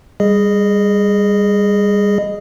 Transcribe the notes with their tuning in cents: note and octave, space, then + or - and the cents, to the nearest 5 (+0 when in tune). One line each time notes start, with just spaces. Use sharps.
G3 +25 G#4 +0 D#5 -15